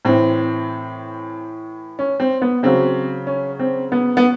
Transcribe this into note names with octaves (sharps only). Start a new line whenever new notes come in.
A2 E3 C4
C#4
C4
B3
C#3 F#3 C4
C#4
C4
B3
B3